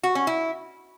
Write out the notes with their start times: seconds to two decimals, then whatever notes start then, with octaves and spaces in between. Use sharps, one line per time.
0.03 F#4
0.15 C#4
0.27 E4